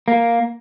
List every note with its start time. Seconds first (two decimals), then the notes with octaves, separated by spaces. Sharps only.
0.08 A#3